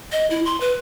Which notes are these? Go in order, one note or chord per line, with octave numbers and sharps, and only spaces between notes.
D#5
E4
C6
B4